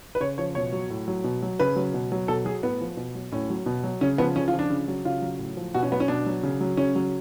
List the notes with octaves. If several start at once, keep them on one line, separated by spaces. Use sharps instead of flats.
B4
C#3 C#5
F3 C#5
B2 C#5
F#3
A2
F#3
B2
F#3
C#3 B4
F#3
B2
F#3
B2 A4
F#3 G#4
A2 B3
F3
B2
F#3
A2 C#4
F#3
B2
F#3
C#3 C#4
F3 B3
C#3 C#4
F4
F3
D4
C#3
F#3
C#3 F4
F#3
A2
F3
B2 F#4
C#4
F#3 B3
C#4
B2 D4
F#3
C#3
F#3
C#3 C#4
F#3